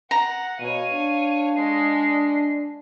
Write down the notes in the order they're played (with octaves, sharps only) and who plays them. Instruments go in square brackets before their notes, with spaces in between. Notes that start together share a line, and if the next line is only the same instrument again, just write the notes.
[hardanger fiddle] F#5 [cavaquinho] A#5
[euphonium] B2 [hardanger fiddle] C#5 F5 [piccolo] D#7
[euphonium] D4
[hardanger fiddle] G#3 D#5 [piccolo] C7